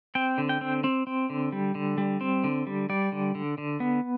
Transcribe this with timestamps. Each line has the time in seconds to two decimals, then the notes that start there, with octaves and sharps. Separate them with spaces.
0.15 C4 G5
0.38 D3
0.49 G5
0.61 C4
0.84 C4
1.07 C4
1.30 D3
1.52 G3
1.75 D3
1.98 G3
2.21 C4
2.44 D3
2.67 G3
2.89 G3 D5
3.12 D3
3.35 D3
3.58 D3
3.80 B3